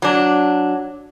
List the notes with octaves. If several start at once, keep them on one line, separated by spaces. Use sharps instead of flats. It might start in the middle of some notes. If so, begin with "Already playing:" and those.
F#3 D4